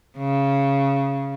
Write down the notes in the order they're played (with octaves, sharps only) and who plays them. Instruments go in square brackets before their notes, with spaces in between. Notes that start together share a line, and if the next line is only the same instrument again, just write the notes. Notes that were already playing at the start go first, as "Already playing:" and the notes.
[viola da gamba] C#3